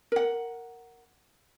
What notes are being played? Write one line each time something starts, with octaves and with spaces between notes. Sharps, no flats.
A#4 F#5